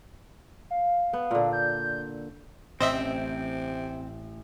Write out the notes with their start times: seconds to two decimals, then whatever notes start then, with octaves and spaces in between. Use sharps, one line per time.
0.71 F5
1.13 B3
1.31 A#2 D3
1.53 G6
2.80 A1 C3 C4 C5 D#5 E5